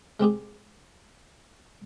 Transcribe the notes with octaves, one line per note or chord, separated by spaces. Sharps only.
G#3 C4 G4 G#4